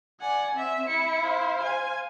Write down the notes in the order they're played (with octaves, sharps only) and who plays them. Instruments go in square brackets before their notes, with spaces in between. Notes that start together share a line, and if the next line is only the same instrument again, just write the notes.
[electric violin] D5 G#5 [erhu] F#5
[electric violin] C4 [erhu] E5
[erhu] E4 [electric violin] C#7
[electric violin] C5 F5
[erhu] G#5